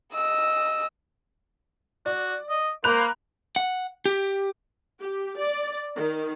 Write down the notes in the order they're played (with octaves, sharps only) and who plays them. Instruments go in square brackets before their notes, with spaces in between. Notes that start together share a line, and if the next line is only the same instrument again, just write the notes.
[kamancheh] D#5 E6
[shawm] F#4 [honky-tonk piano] D5
[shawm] D#5
[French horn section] A#3 [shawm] C5 [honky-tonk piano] B5 F#6 F7
[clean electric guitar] F#5
G4
[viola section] G4
D5
D#3